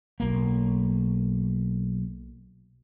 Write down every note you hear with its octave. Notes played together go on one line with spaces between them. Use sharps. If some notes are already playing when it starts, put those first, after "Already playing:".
B1 A#3